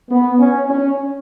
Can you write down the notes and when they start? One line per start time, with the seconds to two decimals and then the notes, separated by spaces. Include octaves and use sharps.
0.10 B3
0.39 C#4
0.68 C#4